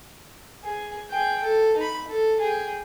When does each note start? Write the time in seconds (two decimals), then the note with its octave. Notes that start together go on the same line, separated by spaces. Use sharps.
0.64 G#4
1.10 G#4 G5
1.42 A4
1.77 D#4 B5
2.08 A4
2.40 G#4 G5